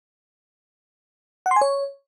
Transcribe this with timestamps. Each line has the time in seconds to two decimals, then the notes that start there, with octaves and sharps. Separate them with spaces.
1.46 F#5
1.51 C6
1.56 G#5
1.61 C#5